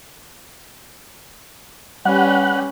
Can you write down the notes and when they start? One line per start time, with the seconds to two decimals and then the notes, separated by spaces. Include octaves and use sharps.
2.05 G3 C#4 B4 F#5